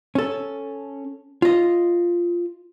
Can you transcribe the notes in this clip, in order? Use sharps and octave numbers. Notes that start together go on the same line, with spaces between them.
C#4 A4
F4 D#5